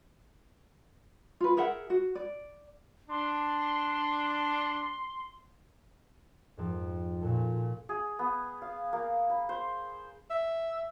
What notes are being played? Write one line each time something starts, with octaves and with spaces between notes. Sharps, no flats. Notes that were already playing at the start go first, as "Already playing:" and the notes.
F4 B4
G#4 A#4 E5 F#5
F#4
D5
D4 C6
F2 G#2
A#2 F#4 A4
G#4
B3
F5
A#3
B5
C5
E5